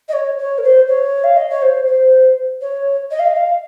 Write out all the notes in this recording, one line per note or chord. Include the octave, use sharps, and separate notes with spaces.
D#5
C#5
C#5
A#4
C5
C#5
F5
D#5
C#5
C5
C5
C#5
D#5
F5
D#5
F5